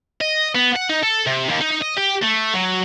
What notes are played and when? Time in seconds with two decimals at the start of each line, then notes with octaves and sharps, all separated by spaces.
0.21 D#5
0.55 B3
0.76 F#5
0.90 D#4
1.03 A4
1.27 C3
1.49 D#2
1.61 D#4
1.81 D#5
1.97 G4
2.22 A3
2.54 F#3